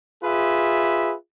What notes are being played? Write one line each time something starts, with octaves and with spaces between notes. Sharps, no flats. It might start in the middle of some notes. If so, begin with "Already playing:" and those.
F4 G#4 B4 E5